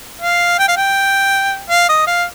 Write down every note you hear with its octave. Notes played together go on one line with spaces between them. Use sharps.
F5
G5
F5
G5
F5
D#5
F5